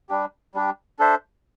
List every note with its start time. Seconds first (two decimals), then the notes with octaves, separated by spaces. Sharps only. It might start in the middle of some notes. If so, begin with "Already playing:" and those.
0.09 G3 D4 G4
0.55 G3 D4 G4
0.99 D4 A4 C5 E5